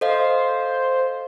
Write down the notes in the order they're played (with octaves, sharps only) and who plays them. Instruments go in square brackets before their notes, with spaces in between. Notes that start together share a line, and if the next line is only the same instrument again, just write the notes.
[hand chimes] A4 D#5 F5 [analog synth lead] C5